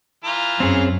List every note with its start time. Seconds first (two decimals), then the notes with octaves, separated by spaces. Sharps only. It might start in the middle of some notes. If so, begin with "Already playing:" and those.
0.24 E3 F4 A#5
0.60 F#2 C4 C#4 G#4